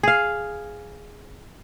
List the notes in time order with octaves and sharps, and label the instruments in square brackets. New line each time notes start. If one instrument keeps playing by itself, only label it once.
[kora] G#4 F5